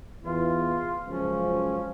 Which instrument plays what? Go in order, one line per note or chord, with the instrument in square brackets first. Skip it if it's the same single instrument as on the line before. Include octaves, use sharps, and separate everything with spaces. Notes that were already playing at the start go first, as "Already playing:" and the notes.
[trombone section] E2 E3 [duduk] F4
[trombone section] C#2 F#2 F3 [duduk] C#4